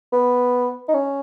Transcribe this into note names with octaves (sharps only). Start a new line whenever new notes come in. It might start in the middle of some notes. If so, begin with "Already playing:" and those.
B3
D#4
C#4